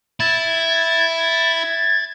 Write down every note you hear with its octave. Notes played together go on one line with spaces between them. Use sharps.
E4 G#6 A6